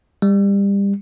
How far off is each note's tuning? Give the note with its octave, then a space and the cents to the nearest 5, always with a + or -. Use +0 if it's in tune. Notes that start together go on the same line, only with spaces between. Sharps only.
G3 +25